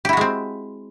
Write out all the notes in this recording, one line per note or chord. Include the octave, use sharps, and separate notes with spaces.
G#3 C4 E4 F#4 G4